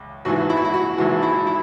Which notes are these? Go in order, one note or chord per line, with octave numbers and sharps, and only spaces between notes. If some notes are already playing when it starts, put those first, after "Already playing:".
Already playing: C#2
G#1 G#2 E3 F#4
E4
F#4
E4
F#4
G#1 G#2 E3 F#4
E4
E4